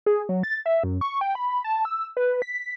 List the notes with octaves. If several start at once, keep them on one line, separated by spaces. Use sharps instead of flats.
G#4
F#3
A6
E5
F#2
C#6
G5
B5
A5
E6
B4
B6